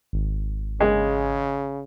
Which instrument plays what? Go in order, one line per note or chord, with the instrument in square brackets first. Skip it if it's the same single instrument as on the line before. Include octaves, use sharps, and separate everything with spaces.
[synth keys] G#1
[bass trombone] C#3 [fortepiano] G#3